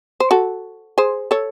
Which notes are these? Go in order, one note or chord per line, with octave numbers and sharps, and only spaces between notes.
C5
F#4 A4
G#4 C5
A4 C#5